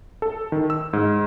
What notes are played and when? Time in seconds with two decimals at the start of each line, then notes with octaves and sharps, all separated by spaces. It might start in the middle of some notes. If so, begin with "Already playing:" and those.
0.22 A4
0.52 D#3
0.70 E6
0.93 G#2